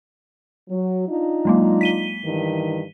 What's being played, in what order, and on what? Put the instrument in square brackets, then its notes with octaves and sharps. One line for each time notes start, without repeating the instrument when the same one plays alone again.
[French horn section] F#3
D4 D#4 F4
[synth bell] F#3 G#3 A#3
B6 D#7 G7
[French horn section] G2 D#3 E3